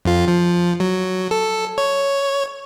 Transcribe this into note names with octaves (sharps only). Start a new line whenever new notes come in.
F2 F4
F3
F#3
A4
C#5